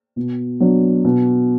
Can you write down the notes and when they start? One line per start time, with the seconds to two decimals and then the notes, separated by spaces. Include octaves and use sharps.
0.16 B2
0.60 F#3 B3 D4
1.04 B2